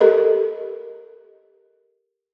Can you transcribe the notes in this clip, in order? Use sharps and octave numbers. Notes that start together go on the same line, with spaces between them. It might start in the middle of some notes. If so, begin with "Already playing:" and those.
G4 A4 A#4 D#5